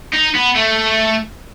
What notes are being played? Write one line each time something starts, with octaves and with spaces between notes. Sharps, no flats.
D#4
B3
A3